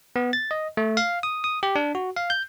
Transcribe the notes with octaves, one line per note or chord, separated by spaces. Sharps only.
B3
A6
D#5
A3
F5
D#6
D#6
G4
D4
F#4
F5
G6